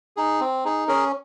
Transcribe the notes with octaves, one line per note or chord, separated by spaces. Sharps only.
D#4 G#4
C4
D#4 G#4
C#4 G#4 A#4